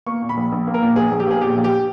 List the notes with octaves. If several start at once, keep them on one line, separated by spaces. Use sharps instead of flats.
A#3 C#6
A#2
B5
A#1
A#1
A#3
A#4
A#2
A#1 G#4
A#1
G4
A#3 G#4
A#2 G4
A#1
G4